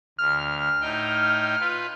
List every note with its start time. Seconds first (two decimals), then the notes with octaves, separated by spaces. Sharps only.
0.19 D2 F6
0.81 A2 D#4 G5
1.60 F4 B4